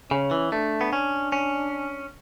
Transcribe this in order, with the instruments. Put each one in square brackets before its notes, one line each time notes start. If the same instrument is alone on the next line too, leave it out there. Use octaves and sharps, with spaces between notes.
[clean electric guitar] C#3 [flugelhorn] C#4
[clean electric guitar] E3
[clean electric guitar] A3 [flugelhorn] D4
[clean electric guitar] B3
C#4
C#4